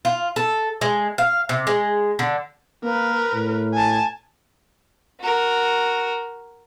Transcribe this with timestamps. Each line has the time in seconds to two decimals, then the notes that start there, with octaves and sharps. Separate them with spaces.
0.05 F4
0.36 A4
0.81 G#3
1.18 F5
1.49 C3
1.67 G#3
2.19 D3
2.84 A#3 A#4 B4
3.33 A2
3.74 G#5 A5
5.20 F#4 A#4